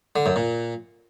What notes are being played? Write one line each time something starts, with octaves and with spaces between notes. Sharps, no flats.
D3
F#2
A#2